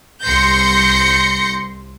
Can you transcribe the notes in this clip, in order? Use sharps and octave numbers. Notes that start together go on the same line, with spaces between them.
C2 C6 G6 A#6 C#7